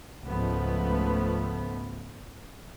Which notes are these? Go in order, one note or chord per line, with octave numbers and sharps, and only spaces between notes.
C#2 G#2 F3 A3 B3